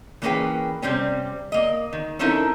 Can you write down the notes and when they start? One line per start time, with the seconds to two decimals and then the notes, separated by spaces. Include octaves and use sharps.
0.22 E3 A#3 C#4 G#4 B4 G5
0.82 C3 G3 C4 C#4
1.52 A#3 D#5
1.93 D#3
2.19 C4 C#4 D#4 E4 A4 A#4